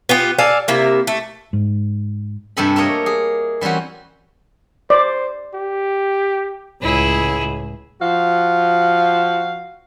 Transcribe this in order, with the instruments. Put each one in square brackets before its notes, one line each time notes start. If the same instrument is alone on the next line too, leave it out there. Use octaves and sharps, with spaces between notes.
[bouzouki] B3 F4 G4
A4 D5 F5 G#5
C3 A#3 E4
A3
[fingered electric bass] G#2
[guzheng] G2 C3 G4 A4 G#5 B5
A3 A#3 A#4 C#5 D#5
G#4
E3 G3 C4 C#4 F#4
[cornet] C5 [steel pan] D5
[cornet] G4
[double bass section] C#2 A2 [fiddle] E4 G#4
[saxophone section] F3 F#4 F5